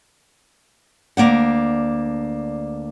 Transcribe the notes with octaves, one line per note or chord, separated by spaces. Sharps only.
D2 A#3 D4 F#5